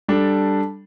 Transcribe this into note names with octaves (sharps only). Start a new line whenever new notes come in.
G3 D4 A4